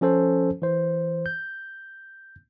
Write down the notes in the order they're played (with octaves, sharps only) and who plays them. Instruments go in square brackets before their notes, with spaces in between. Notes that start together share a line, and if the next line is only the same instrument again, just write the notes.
[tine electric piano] F3 C#4 A4 C5
E3 C5
G6